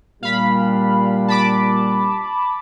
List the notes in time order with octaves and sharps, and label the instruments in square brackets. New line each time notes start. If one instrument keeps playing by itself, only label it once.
[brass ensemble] A#2 G3 D4 [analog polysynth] F5 B5
[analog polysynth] A5 B5 D6